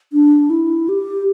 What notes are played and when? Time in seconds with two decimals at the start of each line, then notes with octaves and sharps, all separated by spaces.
0.13 D4
0.50 E4
0.89 G4